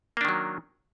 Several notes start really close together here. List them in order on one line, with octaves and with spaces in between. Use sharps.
A#3 D4 D#3 F#3